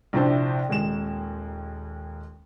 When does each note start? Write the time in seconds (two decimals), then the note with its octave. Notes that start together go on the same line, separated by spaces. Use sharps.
0.13 A#1 C3 D4 E4 C5
0.69 D#1 D#2 G#3 E7